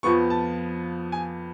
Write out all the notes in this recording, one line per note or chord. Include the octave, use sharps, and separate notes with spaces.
F2 F3 B3 C#6
A5
G#5